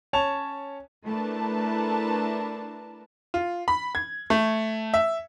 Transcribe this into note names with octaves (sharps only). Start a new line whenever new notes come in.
C#4 C#5 A5 F7
A3 D4 E4 A#4 B4 A5
F4
B5
G#6
A3
E5